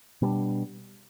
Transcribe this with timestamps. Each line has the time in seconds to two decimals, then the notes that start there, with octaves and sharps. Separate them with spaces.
0.22 B2 G3 A#3 D4